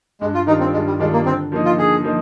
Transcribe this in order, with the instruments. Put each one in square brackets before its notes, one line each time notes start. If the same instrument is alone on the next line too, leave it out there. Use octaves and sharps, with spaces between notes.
[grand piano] G2 [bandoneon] G#3
[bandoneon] F4
[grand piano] D#3 G3 D4 F4 [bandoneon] D#4
[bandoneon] C4
[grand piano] G2 [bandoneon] G#3
[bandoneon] G3
[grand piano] D#3 G3 D4 F4 [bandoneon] G#3
[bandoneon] A#3
[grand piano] D3 [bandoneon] C4
[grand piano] F3 A#3 D#4
[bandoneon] F4
[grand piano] D3 [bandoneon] G#4
[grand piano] F3 A#3 D#4